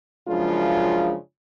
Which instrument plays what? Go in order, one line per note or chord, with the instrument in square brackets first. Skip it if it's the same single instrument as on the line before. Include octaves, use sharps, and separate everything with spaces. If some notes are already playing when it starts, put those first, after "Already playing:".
[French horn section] F#2 C#3 F3 G#3 D4 F4